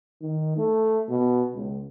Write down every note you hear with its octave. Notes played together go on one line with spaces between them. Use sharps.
D#3
A3
B2
C#2